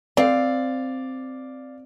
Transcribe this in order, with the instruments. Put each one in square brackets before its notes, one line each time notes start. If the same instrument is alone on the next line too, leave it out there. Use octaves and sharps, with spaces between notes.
[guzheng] C4 [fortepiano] D5 F5